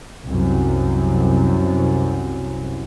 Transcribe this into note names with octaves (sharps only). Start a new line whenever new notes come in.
C2 F#2